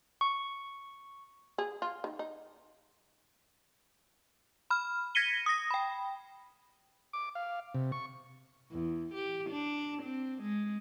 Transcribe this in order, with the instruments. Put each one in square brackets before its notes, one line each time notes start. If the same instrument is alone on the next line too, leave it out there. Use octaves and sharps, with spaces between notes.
[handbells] C#6
[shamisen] G#4
F4
D#3
D#4
[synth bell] B5 F6
G#6 A#6 B6 C#7 D#7 G7
D#6 A#6
G5 B5
[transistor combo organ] D6
F5
C3
C#6
[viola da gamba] E2
G4
D4
C4
G#3